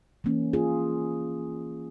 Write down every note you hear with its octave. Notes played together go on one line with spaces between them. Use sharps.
E3 A#3 C#4
F4 G#4